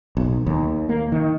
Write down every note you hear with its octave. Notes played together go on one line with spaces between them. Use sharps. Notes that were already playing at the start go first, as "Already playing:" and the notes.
B1
D#2
A#3
D#3